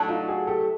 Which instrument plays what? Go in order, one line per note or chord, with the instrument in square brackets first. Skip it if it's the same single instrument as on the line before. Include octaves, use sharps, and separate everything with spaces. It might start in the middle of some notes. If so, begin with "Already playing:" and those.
Already playing: [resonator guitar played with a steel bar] A2 F#3 A3 D4
[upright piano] D#4 F4
F#4 G#4
G4 A4